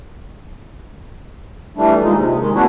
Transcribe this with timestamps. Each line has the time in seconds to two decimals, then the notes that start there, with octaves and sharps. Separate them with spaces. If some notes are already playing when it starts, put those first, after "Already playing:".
1.77 E3 G3 A3 D4
2.02 D#2 A#2 G#3 D#4
2.15 C3
2.39 D#3 G#3
2.55 A3 B3 C#4 D4 E4 F#4